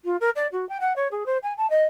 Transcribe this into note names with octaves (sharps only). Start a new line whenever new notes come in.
F4
A#4
D5
F#4
G5
F#5
C#5
G#4
C5
G#5
A5
D#5